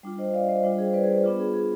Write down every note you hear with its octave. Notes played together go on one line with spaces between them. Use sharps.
G3 D4 F4
C5 D#5
D5 F5
C5 D#5
G3 D4 F4
G#4 C5
B4 D5
G#4 C5
B3 D4 F4
G#4
G#4